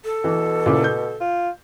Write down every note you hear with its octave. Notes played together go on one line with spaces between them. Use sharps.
A4
B2 E3
A#2 C#3 E4
G6
F4